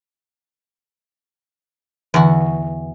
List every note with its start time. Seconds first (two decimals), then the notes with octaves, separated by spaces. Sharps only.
2.14 E2 D3 F#4